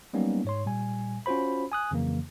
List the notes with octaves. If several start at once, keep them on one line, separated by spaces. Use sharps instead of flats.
F#3 G3 A#3 B3 C#4 D#4
G#2 C#5 C6
A#2 G3 G#5
C#4 F4 F#4 C5 B5
G#5 D#6 F#6
F2 C#3 E3 F#3 A#3